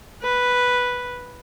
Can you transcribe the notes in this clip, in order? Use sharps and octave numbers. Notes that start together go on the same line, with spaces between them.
B4